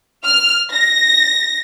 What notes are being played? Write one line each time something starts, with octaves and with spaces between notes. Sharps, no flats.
F6
A#6